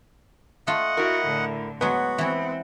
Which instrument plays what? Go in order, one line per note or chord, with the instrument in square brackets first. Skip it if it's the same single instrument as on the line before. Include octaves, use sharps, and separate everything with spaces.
[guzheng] A3 F4 [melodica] D#5 F#5
[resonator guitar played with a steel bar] E4 A#4 [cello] F#4
[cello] A2 D3
[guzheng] F#3 G#3 [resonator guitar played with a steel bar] B3 [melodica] F#4
[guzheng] E3 E4 [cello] C4 F#5